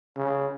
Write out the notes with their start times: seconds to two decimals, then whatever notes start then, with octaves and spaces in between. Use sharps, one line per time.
0.17 C#3